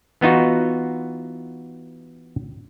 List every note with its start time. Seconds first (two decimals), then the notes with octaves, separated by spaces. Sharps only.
0.21 E3 B3 D#4 F4 F#4